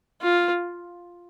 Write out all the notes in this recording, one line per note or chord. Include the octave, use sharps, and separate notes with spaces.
F4